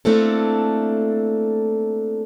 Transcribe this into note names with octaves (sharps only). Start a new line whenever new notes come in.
A3 A#3 C4 D4 E4 A4